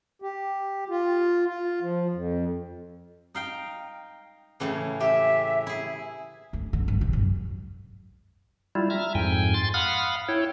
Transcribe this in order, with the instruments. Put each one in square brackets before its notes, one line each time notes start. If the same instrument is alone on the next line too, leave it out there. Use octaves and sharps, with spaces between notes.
[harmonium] G4
F4
F4
F3
F2
[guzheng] D#4 F5 G5
A2 C#3 E3
[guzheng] G4 [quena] E5
[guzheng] E4 G#4
[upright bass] D2
D3
G#1
C3
F#2
[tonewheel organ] G3 E4 F4
E5 A#5 F6
F2 G#2 G5 G#5
C6 A6
F5 F#5 B5 D#6 F6
E4 C#5 G5